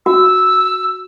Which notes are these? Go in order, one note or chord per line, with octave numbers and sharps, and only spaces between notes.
F#4 E6